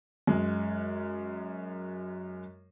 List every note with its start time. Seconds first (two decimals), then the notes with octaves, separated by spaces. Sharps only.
0.27 F#2 G#3